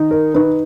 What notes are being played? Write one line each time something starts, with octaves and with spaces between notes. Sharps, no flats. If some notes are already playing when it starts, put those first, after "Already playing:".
Already playing: D#3 D#4
A#4
D#4 B4